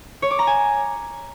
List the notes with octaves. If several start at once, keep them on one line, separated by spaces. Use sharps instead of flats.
C#5
D6
A#5
G#5